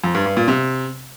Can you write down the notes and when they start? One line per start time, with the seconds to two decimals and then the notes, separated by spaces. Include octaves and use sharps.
0.04 F2
0.15 G2
0.26 G2
0.37 A#2
0.48 C3